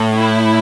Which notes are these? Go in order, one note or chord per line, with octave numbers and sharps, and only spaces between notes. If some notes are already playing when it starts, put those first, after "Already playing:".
Already playing: A2
E4